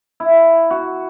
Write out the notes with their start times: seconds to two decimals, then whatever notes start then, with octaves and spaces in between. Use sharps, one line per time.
0.20 E4
0.70 F#4